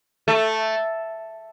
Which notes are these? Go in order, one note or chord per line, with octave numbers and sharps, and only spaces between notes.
A3